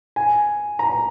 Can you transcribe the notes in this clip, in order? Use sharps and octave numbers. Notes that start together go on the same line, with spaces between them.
G#5
A#5